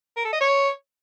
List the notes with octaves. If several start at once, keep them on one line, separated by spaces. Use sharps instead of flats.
A#4
A4
D#5
C#5